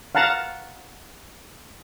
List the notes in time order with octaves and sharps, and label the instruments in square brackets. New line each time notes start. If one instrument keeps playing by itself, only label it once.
[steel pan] F5 F#5 A5 A#5